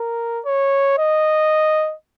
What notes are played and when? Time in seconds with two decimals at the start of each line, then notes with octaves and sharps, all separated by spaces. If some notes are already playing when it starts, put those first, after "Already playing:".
Already playing: A#4
0.45 C#5
0.98 D#5